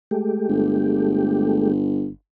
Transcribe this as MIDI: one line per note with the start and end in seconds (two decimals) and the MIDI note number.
0.11 1.72 56
0.11 1.72 57
0.11 1.72 67
0.49 2.10 31